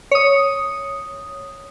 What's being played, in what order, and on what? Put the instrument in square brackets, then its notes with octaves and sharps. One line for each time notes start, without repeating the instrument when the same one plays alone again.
[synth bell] C#5 D#6